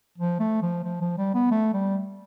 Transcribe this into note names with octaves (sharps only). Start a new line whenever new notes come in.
F3
A3
F3
F3
F3
G3
B3
A3
G3